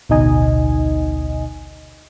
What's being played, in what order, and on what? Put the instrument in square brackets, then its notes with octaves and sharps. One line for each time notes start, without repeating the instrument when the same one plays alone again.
[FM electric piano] A1 D2 B2 D#4 D#5 G#5